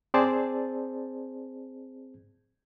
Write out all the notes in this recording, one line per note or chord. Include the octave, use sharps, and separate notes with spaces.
C4 G#4 C5 D5 A5